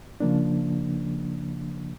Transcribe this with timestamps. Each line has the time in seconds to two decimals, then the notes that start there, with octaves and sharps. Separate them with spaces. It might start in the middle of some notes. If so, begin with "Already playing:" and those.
0.20 C#3 F3 A#3 D4